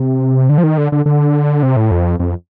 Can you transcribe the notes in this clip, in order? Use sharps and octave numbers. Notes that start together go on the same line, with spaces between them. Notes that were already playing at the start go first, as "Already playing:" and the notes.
Already playing: C3
D3
F3
D#3
D3
D3
D3
C3
A2
F2
F2